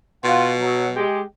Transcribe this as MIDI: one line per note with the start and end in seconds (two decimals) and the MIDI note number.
0.24 1.01 47
0.24 0.50 65
0.24 0.50 78
0.61 0.86 54
0.96 1.20 56
0.96 1.20 67
0.96 1.20 79